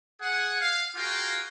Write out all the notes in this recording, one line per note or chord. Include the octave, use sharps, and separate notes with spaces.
G#4 F#5
F5
F4 F#4 G#4 A#4 F5 G5